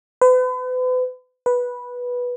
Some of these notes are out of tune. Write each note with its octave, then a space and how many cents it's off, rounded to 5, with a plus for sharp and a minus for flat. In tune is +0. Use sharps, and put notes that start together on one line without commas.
B4 +40
B4 -10